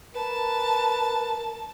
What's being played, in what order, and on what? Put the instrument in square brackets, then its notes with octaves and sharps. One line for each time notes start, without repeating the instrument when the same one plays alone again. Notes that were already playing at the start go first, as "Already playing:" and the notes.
[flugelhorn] A#4 [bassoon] B4 [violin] A5